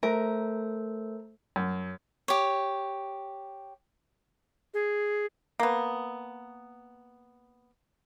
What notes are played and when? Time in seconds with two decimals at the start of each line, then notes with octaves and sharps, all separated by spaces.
0.03 A3 A4 A#4 C5
1.56 F#2
2.28 G4 C#5
4.74 G#4
5.60 A#3 B3